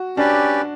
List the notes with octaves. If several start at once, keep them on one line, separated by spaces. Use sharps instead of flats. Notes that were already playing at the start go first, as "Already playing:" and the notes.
Already playing: F#4
C#4 D4 G4 B4 D5